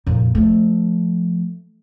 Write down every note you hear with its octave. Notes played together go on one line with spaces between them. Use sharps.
F2 A#2
F3 A3